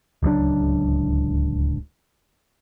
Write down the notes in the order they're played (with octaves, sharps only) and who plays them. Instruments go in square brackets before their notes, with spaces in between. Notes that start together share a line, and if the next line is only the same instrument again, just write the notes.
[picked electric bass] D1 C#2 F#3 D4